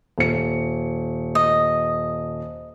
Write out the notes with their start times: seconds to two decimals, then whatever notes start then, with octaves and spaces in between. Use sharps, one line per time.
0.18 D#1 C#7
1.35 D#5